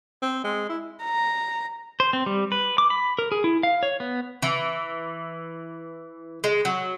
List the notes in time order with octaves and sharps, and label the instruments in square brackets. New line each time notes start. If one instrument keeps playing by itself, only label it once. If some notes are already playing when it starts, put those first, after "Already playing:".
[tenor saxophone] C4
G#3
E4
[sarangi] A#5
[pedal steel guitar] C5
C4
G3
B4
D6
B5
A#4
G#4
E4
F5
C#5
B3
[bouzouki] E3
G#3
F#3